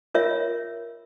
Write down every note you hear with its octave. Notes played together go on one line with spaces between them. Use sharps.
F4 A#4 C#5 E5